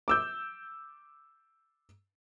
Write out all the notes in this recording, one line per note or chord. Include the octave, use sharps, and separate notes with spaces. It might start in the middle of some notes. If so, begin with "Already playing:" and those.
D6 E6 G6